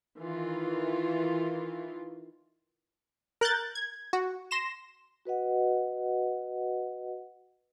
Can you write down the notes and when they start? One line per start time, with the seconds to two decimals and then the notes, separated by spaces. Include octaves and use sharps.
0.18 D#3 E3 F4
3.41 A#4 F#6 G6 A6
3.75 G#6
4.13 F#4
4.51 C6 A#6 E7
5.25 F#4 B4 D#5 F#5